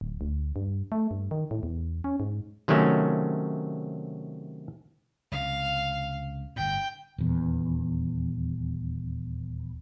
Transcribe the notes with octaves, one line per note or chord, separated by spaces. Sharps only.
D1
D2
G2
A3
G2
D#3
A2
E2
C#4
G#2
C3 D#3 F#3 A3 C#4 F#4
C#2 C3 F5
G1 A2 G5 G6
D#1 E2